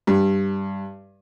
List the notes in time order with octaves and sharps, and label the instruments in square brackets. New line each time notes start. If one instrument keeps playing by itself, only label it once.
[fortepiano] G2